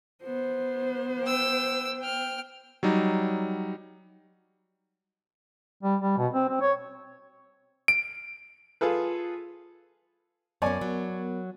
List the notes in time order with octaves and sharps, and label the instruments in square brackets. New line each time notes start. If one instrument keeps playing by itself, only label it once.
[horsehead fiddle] B3 C5
[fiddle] G5 E6
G5 F6
[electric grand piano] F#3 G3 D#4
[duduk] G3
G3
B2
C4
C4
C#5
[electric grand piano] D7
[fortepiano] F4 G#4 A4 B4
[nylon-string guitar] F#2 C#4 [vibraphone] B3 A#4 [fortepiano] C#5 D5 G#5
[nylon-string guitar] F#3